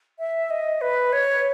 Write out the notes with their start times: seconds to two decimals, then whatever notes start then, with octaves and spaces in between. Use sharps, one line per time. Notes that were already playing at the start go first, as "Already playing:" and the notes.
0.19 E5
0.50 D#5
0.81 B4
1.13 C#5